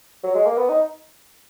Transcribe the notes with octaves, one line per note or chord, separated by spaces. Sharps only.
F#3
G#3
A#3
B3
D#4